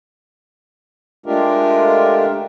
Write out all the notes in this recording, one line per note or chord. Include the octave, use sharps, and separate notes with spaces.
G#3 A3 D4 F4 G4 A#4